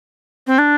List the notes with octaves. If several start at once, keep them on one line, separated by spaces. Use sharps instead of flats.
C4
D4